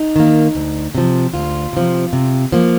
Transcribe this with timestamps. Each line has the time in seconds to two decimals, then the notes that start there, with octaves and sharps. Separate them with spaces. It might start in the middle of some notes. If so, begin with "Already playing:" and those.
Already playing: D#4
0.16 D#3 A#3
0.55 D2
0.95 C3 F3
1.34 D2 F4
1.73 C3 F3
2.13 C3
2.52 F3 A#3